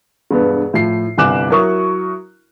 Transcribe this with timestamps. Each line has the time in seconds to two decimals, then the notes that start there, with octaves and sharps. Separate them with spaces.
0.31 E1 G2 B3
0.73 A2 F3 C7
1.17 G1 C2 G#5 D6 F#6 E7
1.50 F#3 E4 F#4 A#4 C#6 D#6